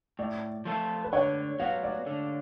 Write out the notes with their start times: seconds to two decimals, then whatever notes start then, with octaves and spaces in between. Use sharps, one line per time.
0.19 A2 D5
0.65 F3 A3 F4 A4
1.04 B4
1.13 D3 C#5
1.60 F#3 B3 F#4 F5
1.83 D5
2.07 D3